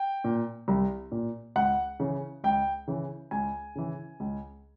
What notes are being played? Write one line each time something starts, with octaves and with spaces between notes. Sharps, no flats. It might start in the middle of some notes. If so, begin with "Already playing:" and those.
Already playing: G5
A#2
C2
A#2
C#2 F#5
C#3 E3
C#2 G5
C#3 E3
C#2 G#5
C#3 E3
C#2